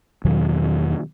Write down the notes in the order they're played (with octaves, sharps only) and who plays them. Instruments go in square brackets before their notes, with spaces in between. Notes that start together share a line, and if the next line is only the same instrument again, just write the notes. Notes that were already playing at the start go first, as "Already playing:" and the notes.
[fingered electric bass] E2 B2 D#3 F#3